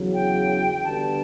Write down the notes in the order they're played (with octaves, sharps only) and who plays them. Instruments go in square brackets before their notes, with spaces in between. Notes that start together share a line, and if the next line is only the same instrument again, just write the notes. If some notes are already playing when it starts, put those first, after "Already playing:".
Already playing: [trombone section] E2 C#3 F#3
[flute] G5
[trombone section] D3 G3 B3 D4 [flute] A5